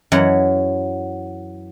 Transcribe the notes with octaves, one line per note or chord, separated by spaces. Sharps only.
F#2 E3 F#3 F#5